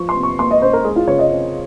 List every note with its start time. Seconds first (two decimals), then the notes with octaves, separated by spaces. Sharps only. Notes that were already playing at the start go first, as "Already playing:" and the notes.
Already playing: F3 C#6
0.09 C6
0.16 C3
0.23 C#6
0.39 A#3 C6
0.51 D#5
0.62 C#4 C5
0.73 A#4
0.84 G#3 G#4
0.96 F4
1.07 C#3 C#5
1.19 D#5
1.30 C4